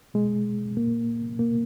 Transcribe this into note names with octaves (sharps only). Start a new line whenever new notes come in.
B2 G#3
A#2 A#3
B2 A#3